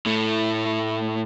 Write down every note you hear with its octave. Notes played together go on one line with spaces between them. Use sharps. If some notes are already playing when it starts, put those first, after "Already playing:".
A2 A3